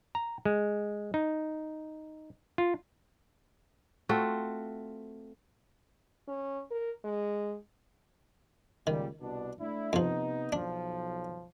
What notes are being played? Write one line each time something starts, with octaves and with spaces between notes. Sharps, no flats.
A#5
G#3
D#4
F4
A3 C4 F4 F#4
C#4
A#4
G#3
C#2 A#2 D#3 G3
C2 B2 D4
A3 D4 E4
F2 C3 F3 B3 D#4
B1 F3 D4